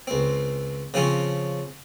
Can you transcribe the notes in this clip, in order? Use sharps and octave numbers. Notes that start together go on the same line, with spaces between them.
C#2 C4
C#3 F3 C4 C#4